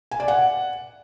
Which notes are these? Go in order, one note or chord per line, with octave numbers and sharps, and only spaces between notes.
G#5
D5
F#5